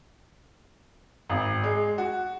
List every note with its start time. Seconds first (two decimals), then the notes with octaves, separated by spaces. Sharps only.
1.29 G#1
1.64 G#3
1.98 F#4